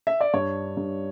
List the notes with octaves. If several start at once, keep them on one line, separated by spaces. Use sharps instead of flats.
E5
D5
G2 C#5
G2